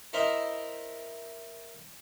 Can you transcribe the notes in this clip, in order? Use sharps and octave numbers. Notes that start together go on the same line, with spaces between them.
E4 A#4 C5 D#5 E5